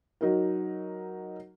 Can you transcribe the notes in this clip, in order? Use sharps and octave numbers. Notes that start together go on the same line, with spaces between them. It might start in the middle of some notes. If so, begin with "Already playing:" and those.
F#3 D#4 F#4 A#4